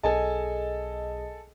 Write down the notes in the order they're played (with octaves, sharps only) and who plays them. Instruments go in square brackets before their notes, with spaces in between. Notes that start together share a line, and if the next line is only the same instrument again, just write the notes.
[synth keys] B1 G#4 D#5 [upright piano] A4 G#5 A5